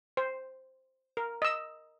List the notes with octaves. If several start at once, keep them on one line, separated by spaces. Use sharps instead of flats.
C5
A#4
D#5 E6